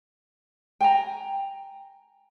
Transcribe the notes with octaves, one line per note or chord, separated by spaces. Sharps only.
G5 G#5 A#5